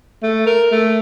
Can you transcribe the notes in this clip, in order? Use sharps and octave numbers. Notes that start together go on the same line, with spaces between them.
A3
A#4
A3